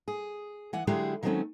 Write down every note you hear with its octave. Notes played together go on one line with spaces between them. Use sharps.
G#4
E3 F#5 G#5
D3 F#3 G#3 E4 G4 G#4
D#3 F#3 G#3 A3 C4 C#4